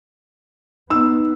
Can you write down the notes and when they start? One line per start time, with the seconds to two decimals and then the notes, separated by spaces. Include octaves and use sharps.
0.90 B3 D#4 E6